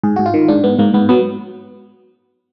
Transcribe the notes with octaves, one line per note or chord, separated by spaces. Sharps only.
G#2 G#4
G#2 F#4
F4
D#3
G#2 D4
G#2 B3
G#2 A#3
G#2 B3
F#3 B3